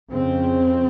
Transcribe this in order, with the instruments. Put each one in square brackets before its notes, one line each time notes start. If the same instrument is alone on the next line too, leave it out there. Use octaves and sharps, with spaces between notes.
[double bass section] F2 C#3 C4